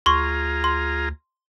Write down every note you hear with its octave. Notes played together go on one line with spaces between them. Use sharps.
D2 F4 G#4 A#5 C6 C#6
C6